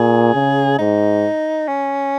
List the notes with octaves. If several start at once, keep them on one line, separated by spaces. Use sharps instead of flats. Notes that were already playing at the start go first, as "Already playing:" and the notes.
Already playing: A#2 G#4
C#3
G#2 D#4
C#4